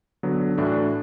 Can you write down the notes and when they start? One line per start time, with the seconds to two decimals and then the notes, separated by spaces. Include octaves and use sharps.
0.23 D3 F#3 B3
0.57 A2 E3 A3 D4 F#4